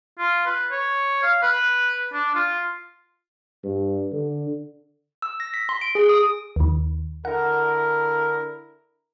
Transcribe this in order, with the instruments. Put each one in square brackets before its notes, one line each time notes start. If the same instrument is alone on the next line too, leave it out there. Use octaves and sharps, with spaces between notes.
[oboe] F4
B4
C#5
F5
B4
D4
F4
[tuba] G2
D3
[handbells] E6
A#6
B6
C6
D7
G#4
D#6
[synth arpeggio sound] D#2 D#3
[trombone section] D3 E4 A#4 [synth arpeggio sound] F#5